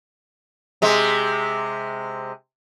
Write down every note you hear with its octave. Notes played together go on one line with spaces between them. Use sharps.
C3 G#3